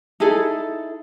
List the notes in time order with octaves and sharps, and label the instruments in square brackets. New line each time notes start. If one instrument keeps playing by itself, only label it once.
[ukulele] D#4 E4 G#4 A4